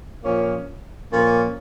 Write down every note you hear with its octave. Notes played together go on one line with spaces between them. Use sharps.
A#2 F3 A#3 C#4
A#2 F3 A#3 C#4